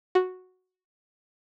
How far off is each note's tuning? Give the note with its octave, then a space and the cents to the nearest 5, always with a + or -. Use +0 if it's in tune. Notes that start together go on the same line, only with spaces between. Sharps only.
F#4 -5